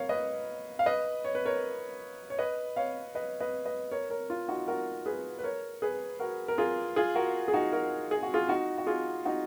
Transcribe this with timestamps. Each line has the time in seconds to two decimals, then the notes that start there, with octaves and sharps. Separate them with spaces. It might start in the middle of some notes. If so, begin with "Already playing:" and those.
Already playing: A#4 C#5 F5
0.09 B4 D#5
0.79 F5
0.86 B4 D#5
1.24 C#5
1.35 B4
1.45 A#4 C#5
2.30 C#5
2.39 B4 D#5
2.76 C#5 F5
3.15 B4 D#5
3.40 B4 D#5
3.66 B4 D#5
3.91 A#4 C#5
4.10 A#4 C#5
4.30 F4
4.48 D#4 F#4
4.68 F#4 A#4
5.06 G#4 B4
5.39 B4
5.43 A#4 C#5
5.82 G#4 B4
6.20 F#4 A#4
6.48 A#4
6.58 F4 G#4
6.96 F4 G#4
7.15 F#4 A#4
7.48 G#4
7.54 D#4 F#4
7.73 F#4 A#4
8.11 G#4
8.23 F#4
8.34 F4 G#4
8.49 D#4 F#4
8.78 F#4
8.87 F4 G#4
9.25 D#4 F#4